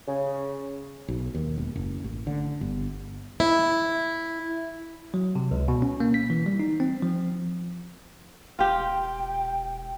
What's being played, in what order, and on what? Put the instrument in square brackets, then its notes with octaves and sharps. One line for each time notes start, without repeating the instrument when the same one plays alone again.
[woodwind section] C#3
[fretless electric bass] B1
D#2
E1
F#1
A1
D3
G1
[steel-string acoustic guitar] E4
[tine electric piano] F#3
C3
C#2
B2
C#4
A#3
B6
E3
G3
D#4
C4
F3
[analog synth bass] E1 [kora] F4 G4 [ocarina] G5